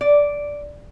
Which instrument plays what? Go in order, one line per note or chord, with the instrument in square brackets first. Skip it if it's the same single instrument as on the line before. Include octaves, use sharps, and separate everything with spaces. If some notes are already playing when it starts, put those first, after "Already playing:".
[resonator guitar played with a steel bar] D5